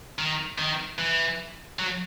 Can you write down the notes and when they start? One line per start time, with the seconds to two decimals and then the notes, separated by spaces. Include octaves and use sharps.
0.18 D#3
0.58 D#3
0.98 E3
1.79 F#3